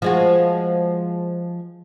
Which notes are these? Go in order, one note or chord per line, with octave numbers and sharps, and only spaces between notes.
F3 G#3 F#4